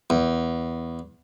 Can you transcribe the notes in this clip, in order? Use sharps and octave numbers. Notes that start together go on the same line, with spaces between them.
E2